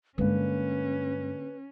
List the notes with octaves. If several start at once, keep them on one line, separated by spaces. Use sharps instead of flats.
G2 D3 G#3 A#3 C#4 B4